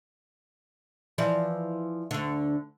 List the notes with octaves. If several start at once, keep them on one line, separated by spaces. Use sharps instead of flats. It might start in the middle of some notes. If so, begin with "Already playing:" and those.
E3 F3 D5
D2 D3